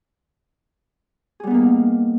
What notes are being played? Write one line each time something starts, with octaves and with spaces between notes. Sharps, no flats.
G3 A#3 B3 D#4 G#4